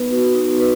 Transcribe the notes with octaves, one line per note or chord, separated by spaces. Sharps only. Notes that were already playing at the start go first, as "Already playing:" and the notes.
Already playing: B3 D#4 B4
F#4
D#4
B4